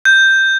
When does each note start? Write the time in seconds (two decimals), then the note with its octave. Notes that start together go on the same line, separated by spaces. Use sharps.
0.05 G6